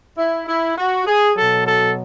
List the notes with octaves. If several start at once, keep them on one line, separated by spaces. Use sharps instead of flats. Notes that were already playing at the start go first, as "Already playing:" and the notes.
E4
E4
F#4
G#4
B2 F#3 A4
A4